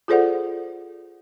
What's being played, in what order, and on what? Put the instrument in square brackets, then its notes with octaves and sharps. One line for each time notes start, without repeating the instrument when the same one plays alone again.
[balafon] F4 G#4 A4 C5 D5 F#5